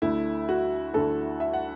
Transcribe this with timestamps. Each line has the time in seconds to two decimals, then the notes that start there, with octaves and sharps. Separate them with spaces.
0.02 D2 D3 A3 E4
0.49 F#4
0.93 D2 D3 A3 A4
1.40 E5
1.53 F#5